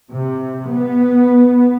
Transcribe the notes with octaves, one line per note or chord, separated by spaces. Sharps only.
C3
B3